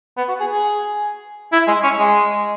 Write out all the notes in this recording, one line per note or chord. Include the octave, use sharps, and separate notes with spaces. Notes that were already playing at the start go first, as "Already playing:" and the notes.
B3
F#4
G#4
G#4
E4
G#3
C#4
G#3